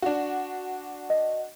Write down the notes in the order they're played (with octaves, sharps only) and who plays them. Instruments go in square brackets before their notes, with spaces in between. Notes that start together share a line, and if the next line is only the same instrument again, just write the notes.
[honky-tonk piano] D4 F#4
[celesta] D#5